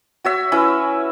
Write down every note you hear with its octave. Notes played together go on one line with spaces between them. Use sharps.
F#4 C#5 E5
C#4 E4 B4